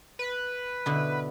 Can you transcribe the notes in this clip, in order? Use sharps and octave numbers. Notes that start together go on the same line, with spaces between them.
B4
B2 D3 E4